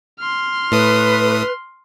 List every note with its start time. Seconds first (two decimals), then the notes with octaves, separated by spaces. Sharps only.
0.20 C6 F6
0.72 A2 A3 B4 D#6